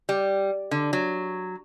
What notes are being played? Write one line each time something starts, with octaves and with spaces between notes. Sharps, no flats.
G3
D3
F#3